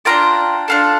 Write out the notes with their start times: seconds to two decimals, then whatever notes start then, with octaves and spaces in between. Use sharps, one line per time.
0.05 D4 F4 A4 G5 A#5
0.68 D4 F4 A4